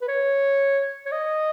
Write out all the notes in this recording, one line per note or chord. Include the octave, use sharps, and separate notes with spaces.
B4
C#5
C#5
D#5